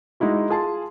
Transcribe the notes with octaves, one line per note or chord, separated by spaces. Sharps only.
G#3 D#4 E4 F#4
F4 G#4 A5 C6